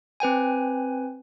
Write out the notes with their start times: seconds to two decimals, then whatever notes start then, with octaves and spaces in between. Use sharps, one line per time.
0.20 C4 B4 G5 G#5